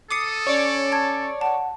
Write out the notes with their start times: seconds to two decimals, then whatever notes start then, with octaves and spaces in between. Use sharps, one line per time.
0.11 A4 D6 D#6 C7 C#7
0.47 C#4 C#5 D5
0.92 A5 G#6
1.41 F#5 A5